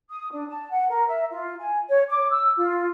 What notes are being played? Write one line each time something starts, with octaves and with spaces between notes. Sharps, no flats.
D#6
D4
A5
F#5
A#4
E5
F4
G#5
C#5
D6
E6
F4